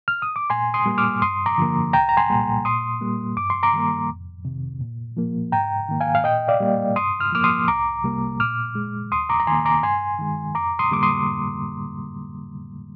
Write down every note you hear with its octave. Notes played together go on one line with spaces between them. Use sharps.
F6
D#6
D6
A#2 G#5 C6
C6 D#6
G3 A#3
D6 F6
G2 C6 D#6
A#5 D6
D3 F3 A#3
C2 G5 A#5
A#5
G#5 C6
A#2 G3 A#3
A#2 C6 D#6
G3 A#3
G2 D6
C6
A#5 D6
D#3 G3 A#3
F2
C3 D#3
A#2
F3 A#3
G#2 G5 A#5
D#3 A#3
F5 G#5
F5
A#2 D#5 G5
D5 F5
G3 A#3
G2 C6 D#6
F6
F3 A#3 D6 F6
C6 D#6
C2 A#5 D6
C3 G3 A#3
A#2 D6 F6
G#3
D#2 C6 D#6
A#5 D6
A#5
D#3 A#3 G#5 C6
A#5 D6
G2 G#5 C6
D#3 G#3
F2 A#5 D6
C6 D#6
D3 G3 A#3 D6
C6 D#6